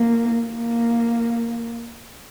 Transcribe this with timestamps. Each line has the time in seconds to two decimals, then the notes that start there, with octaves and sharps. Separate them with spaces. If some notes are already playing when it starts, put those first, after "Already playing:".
Already playing: A#3
0.46 A#3